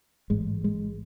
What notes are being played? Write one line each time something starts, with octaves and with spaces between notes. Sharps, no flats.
A1 G#2 G#3
G#3